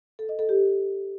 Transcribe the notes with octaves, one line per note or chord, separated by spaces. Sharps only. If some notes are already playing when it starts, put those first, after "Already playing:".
A4
D#5
A4
G4